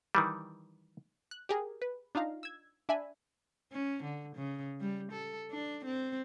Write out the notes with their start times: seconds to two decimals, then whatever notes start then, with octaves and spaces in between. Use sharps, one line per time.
0.15 D#3 E3 G3
1.31 F#6
1.49 G4 G#4 A#4
1.82 B4
2.15 D4 D#4 F4 F5 A#5
2.43 E6 G#6
2.89 D4 E5 G#5 B5
3.72 C#4
4.03 D3
4.36 C#3
4.80 G3
5.12 A4
5.51 D4
5.85 C4